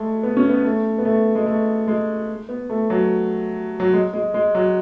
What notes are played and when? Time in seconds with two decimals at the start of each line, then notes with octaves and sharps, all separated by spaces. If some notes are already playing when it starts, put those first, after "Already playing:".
Already playing: G#3 A3
0.23 B3
0.37 C#4
0.49 B3
0.64 A3
0.98 B3
1.05 A3
1.35 G#3
1.46 A3
1.88 G#3
2.49 B3
2.70 A3
2.90 F#3
3.80 F#3
3.93 G#3
4.14 G#3
4.34 G#3
4.55 F#3